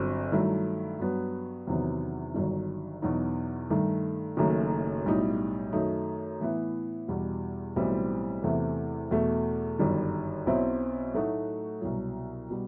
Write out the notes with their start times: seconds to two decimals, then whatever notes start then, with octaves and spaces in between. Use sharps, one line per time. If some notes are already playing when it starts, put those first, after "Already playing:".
Already playing: G1 G2 F#3 C4
0.32 G2 D#3 F#3 A3 E4
0.99 G2 F#3 B3 F#4
1.67 E2 C3 D#3 F#3 B3
2.35 G1 G2 D#3 F#3
3.02 E2 B2 F#3 B3 D#4
3.70 G2 D#3 A3
4.37 F#1 F#2 D#3 A3
5.06 B1 A2 G3 D#4
5.73 F#2 D#3 A3 D#4
6.40 A2 E3 B3 E4
7.08 E2 B2 G3
7.76 B1 A2 E3 G3 C4
8.44 E2 C3 E3 A3
9.11 E2 B2 A3
9.79 G1 F#2 D#3 G3
10.47 B1 B2 F#3 C4 E4
11.14 A2 F#3 A3 D#4 F#4
11.81 C2 B2 F#3
12.50 B2 G3